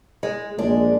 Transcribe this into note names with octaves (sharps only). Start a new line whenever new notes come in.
G#3
A#1 G#3 D4